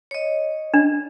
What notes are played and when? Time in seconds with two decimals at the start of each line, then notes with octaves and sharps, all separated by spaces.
0.11 C#5 D#5
0.74 D4